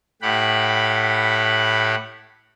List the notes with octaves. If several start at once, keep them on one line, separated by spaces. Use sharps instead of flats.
A2 G4 F#5 B5